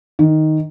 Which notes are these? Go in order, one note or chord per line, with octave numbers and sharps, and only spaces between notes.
D#3